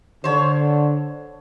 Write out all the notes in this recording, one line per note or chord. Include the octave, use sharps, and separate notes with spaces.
D3 C5 C#5